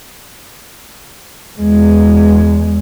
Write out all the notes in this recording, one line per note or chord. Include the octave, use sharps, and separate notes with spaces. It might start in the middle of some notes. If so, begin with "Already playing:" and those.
E2 G#3